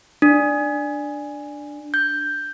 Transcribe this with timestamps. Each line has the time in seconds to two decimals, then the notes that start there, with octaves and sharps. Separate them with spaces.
0.22 D4
1.94 G6